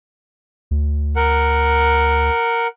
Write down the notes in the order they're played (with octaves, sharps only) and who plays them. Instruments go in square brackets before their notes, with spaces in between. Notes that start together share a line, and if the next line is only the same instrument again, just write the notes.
[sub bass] D2
[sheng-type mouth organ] A#4 F#5